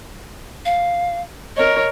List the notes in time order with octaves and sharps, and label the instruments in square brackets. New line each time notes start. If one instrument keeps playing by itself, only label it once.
[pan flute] F5
[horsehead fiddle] A#4 C#5 [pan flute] D#5